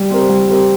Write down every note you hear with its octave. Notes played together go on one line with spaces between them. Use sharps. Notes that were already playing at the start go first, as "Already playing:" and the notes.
Already playing: G3
C4 G4 A#4
G3
C4 G4 A#4